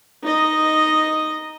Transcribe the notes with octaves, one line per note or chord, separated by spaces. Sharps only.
D#4 D#5